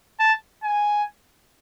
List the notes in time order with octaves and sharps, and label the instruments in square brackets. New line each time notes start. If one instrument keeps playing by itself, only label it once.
[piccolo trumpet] A5
G#5